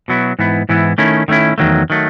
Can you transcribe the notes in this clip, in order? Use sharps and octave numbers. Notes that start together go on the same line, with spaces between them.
B2 F#3 B3 E4
G#2 E3 B3 E4
G#2 E3 B3 E4
D#3 A3 C#4 E4
D#3 A3 C#4 E4
E2 D#3 F#3 A3
D#3 F#3 A3